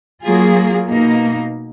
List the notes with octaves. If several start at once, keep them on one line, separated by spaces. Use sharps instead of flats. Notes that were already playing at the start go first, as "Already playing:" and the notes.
F#3 A#3 F4 G#4
B2 A#3 D#4